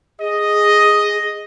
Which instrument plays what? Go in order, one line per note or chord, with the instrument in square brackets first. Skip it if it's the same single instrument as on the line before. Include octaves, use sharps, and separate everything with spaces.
[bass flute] G#4 [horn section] D#5